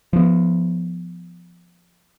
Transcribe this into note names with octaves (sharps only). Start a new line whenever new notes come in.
F3 B3